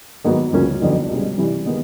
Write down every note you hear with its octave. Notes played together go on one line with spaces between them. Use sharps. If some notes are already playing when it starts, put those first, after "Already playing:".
G#2 D#3 F#3 B3
D2 C#3 F3 A#3 C#4
F2 D3 F#3 B3 D#4
C2 B2 G#3 C#4
C3 E3 G3
D#3 G#3 B3 D#4